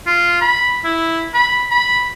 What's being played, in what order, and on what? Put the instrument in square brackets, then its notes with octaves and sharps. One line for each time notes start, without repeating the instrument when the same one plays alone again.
[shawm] F4
B5
E4
B5
B5